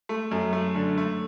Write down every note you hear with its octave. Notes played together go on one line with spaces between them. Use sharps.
A3
F#2
A3
D3
A3